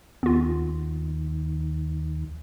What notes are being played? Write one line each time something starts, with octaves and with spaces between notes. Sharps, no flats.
D#2 B3 F4